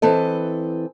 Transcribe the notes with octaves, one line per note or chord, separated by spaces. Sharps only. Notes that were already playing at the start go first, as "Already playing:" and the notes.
E3 C4 A4 D#5